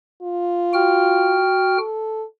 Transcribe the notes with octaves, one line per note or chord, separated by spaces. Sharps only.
F4
F#4 G5 F6
A4